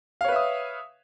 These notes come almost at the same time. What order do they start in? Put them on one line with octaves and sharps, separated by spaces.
F5 C#5 B4 E5 D#6